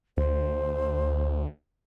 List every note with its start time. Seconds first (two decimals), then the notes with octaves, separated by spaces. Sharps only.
0.17 D2 C5